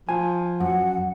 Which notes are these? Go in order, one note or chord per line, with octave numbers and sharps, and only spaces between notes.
F3 G#5
F#2 F#5